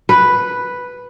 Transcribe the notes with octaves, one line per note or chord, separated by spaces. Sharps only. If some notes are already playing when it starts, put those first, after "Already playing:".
B4